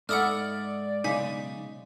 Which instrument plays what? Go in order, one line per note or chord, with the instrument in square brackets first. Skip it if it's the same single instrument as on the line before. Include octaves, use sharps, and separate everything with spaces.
[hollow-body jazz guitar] G#2 [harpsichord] A4 E5 B5 [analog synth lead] D5 [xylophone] F#5 D#6 F6
[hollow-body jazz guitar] B1 D#4 [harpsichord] C#3 G#3 [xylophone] G#5 B6